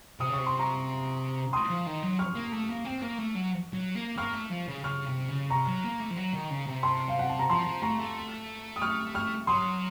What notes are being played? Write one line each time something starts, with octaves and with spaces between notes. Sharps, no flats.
C3 D#6
C#3
C3 C#6
C6
A#5 C#6
C6 D#6
F3
D#3
F#3
C#6 F6
A#3
A3
A#3
C4
A#3
A3
F#3
F#3
A#3
A#3 C#6 F6
A3
F3
C#3
C#3 C#6 F6
C3
C#3
C3 A#5 C#6
F#3
A#3
A3
F3
F#3
D#3
C#3
C3
A5 C6
F5
F#5
A5
A#5
F3 A5 C6
F3
A3 A#5 C#6
A3
D#6
C#6 F6
C#6 F6
F#3 C6 D#6